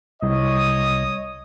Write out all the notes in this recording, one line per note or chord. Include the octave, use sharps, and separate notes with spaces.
C2 C#5 D#5 D#6